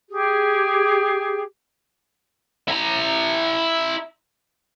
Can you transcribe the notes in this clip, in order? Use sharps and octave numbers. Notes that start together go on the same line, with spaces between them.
G4 G#4
E4 A#5